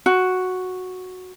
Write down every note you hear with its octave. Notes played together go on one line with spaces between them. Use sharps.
F#4